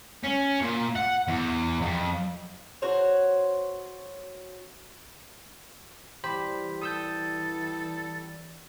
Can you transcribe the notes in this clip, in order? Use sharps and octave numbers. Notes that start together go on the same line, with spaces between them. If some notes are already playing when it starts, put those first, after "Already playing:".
C#4
A#2
F#5
E2
F2
F#4 C5 C#5
E3 G3 G4 C5 B5
A4 D#6 E6 G6